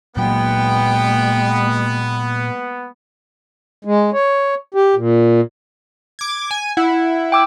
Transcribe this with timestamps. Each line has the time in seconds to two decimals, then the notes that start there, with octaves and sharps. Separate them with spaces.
0.17 A#2 F#3 G#3 A#3 B3 G5
3.85 G#3
4.13 C#5
4.74 G4
4.96 A#2
6.19 D6 G#6
6.51 G#5
6.77 E4 F#5
7.32 G5 D6 E6